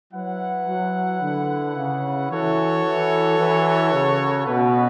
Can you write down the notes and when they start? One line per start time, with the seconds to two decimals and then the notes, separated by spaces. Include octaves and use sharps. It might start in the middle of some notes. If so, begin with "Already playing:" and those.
0.13 F#3 E4 B4 F#5
0.67 F#3
1.21 D3
1.76 C#3
2.29 E3 F#4 A4 C#5
2.84 E3
3.38 E3
3.92 C#3
4.46 B2 A3 C#4 F#4 B4